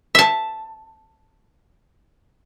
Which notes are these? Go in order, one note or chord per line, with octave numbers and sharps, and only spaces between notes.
E5 A5